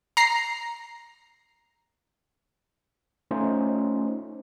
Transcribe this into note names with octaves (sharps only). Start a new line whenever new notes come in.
A#5 C7
A3 C#4 D#4 F4 C5